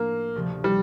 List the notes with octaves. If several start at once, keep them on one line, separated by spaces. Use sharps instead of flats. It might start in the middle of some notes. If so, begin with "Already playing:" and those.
Already playing: A2 F3 A3 A#3 D4
D2 C3 F3
G3